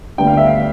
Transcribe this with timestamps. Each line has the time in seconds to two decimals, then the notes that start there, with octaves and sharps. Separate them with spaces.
0.18 D2 D3 G3 B3 G5
0.27 F5
0.37 E5
0.47 F5